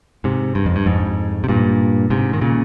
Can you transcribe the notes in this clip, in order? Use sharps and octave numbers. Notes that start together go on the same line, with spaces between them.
G#2 C3
G2
F2
G2
F2 G#2
C3
G2 A#2
G#2 C3
D#3
A#2 C#3